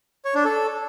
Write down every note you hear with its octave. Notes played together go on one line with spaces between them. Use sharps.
C#5
D4
A4